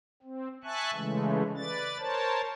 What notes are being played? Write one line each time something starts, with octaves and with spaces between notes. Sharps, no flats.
C4
E5 G#5 A5 C#6 F#6
C#3 E3 G#3 A3
B4 D5 A6
A#4 C5 C#5 A5